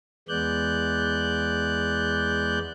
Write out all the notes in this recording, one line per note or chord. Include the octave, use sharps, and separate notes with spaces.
E2 G#3 B3 D5 F#6 G6